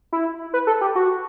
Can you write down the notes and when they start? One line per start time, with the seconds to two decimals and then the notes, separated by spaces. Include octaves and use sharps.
0.13 E4
0.54 B4
0.67 A4
0.81 G4
0.95 F#4